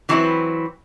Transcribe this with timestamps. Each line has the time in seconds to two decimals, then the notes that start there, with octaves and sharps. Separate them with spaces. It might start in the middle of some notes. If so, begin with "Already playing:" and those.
0.09 E3 F#3 C4 D4 E4 B4